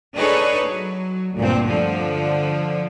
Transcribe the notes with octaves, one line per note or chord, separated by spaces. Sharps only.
D4 D#4 G#4 A4 B4 C#5
F#3
D2 G2 A#2 C4
D3 F3